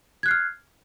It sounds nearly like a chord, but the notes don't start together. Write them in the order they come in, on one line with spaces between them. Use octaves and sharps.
G#6 F#6 C7 F6